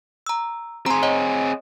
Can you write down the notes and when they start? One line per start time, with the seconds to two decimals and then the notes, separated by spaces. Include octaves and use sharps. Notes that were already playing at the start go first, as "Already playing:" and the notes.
0.27 A#5 E6
0.86 C4 G#4 A#5 C6
1.03 C#5 D#5 F#5